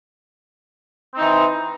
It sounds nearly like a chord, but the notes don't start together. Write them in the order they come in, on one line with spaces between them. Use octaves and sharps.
C4 D#4 E3